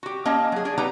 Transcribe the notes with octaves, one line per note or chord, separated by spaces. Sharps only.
F#4 G4
A#3 C#4 D#5 A5
F#3 G#4
D4 G#4
G3 B3 D#4 G4 B4 A#5